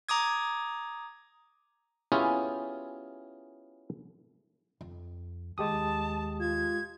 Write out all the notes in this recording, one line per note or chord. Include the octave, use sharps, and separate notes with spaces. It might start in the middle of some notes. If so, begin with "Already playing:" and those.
A#5 D6 D#6 G#6
B3 C#4 E4 F4 G4 G#4
F2
D#2 G#3 G4 A5 D#6
F4 G#6